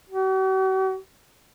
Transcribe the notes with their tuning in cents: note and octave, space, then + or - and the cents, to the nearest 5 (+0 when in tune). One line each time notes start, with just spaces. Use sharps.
F#4 +45